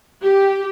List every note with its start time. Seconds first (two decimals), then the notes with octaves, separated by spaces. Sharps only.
0.24 G4